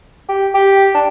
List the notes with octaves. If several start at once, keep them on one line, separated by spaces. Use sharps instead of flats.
G4
G4
D4